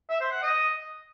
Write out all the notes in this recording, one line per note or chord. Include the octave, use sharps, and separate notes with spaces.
E5
C5
F#5
D#5